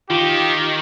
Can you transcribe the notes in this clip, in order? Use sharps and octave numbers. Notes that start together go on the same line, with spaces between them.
D#3 F4 G4